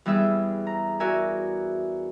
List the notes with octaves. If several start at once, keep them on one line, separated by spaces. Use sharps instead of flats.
E2 G3 G#4 E5 E6
A#5
F#4 A#4 D5 E5 G#5